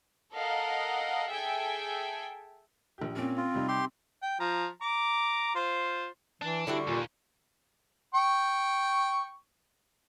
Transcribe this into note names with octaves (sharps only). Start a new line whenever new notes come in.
A4 A#4 D#5 F5 F#5
G#4 A4 E5 G5 G#5
A#1 G4
A#2 C4 C#4
F4
C3 G3 D#4
G4 C6
G5
F3 A#5
A#5 D6
F4 C5
E3 D4
D3 G3 E4 F#4
D#2 A#2
G5 C#6